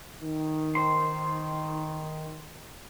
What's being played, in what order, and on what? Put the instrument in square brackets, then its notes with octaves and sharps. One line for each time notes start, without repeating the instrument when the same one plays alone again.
[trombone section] D#3
[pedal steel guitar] C5 C6